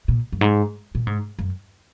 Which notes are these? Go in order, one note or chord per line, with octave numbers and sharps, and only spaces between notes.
A#2
F#2
G#2
A#2
G#2
F#2